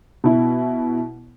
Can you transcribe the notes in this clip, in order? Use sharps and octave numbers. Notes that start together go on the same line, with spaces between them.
B2 E4